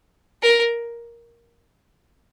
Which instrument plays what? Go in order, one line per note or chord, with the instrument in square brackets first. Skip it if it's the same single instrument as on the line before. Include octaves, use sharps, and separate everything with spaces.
[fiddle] A#4